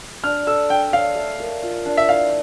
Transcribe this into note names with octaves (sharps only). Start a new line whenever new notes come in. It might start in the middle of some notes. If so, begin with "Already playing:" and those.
D4 F6
A4 E6
D4 G5
C#5 F5
A3
A#4
F4
D4
E5
E4 F5